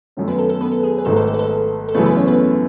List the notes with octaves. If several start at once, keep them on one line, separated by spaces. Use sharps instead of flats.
F#2 D#3 A3 C#4
B3 B4
A4
A4
B3 B4
A4
G#4
B4
G#1 G#2 D#3 A3 D#4 A4
A4
A4
B4
A4
A4
F#2 C#3 E3 A3 B3 B4
B3 B4
C#4 C#5
B3 B4